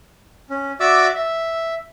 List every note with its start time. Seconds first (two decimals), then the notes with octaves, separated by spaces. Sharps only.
0.50 C#4
0.80 F#4 D5 E5 D6 E6
1.15 E5